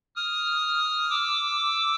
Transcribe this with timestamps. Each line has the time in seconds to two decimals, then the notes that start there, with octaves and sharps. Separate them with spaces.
0.16 D#6 F6
1.10 D6 E6